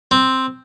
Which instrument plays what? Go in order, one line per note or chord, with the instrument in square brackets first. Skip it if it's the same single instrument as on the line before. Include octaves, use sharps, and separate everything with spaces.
[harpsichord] C4